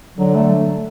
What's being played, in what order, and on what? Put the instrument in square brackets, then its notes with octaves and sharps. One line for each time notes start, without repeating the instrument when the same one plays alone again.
[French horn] D3 [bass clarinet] F#3
[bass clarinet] A3